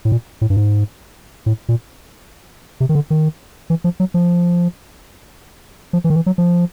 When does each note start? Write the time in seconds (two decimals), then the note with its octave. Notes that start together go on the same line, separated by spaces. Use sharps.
0.05 A2
0.12 A#2
0.41 A2
0.50 G2
0.57 G#2
1.46 A2
1.69 A#2
2.80 C3
2.89 D#3
2.95 D3
3.10 D#3
3.70 E3
3.84 F3
4.00 F#3
4.14 F3
5.93 F3
6.04 E3
6.10 D#3
6.16 E3
6.26 F#3
6.38 F3